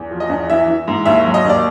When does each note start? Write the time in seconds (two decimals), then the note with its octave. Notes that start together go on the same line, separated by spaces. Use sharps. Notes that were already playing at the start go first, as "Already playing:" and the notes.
Already playing: E2
0.11 F3
0.20 D#5
0.30 E2
0.50 E3 E5
0.68 E3
0.87 G#2
1.05 D#2 E5
1.25 F#3
1.34 D#5
1.44 D#2
1.49 D5